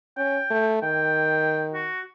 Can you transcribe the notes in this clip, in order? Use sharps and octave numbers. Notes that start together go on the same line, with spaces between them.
C#4 G5
A3
D#3 G5
F#4